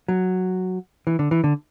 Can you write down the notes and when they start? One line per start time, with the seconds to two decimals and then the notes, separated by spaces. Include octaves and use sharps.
0.08 F#3
1.07 E3
1.19 D3
1.31 E3
1.44 D3